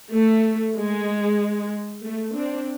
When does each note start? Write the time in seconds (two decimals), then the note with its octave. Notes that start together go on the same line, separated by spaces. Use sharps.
0.13 A3
0.76 G#3
2.04 A3
2.36 C4 D4